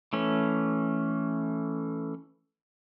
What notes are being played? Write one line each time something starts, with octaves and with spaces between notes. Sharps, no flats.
E3 A3 C#4